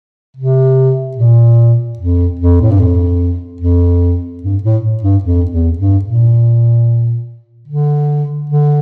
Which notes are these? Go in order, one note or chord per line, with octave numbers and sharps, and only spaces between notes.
C3
A#2
F2
F2
A2
G2
F2
F2
G2
A2
G2
F2
E2
G2
A#2
D3
D3